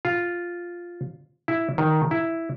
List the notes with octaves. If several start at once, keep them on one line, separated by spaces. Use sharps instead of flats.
F4
E4
D#3
E4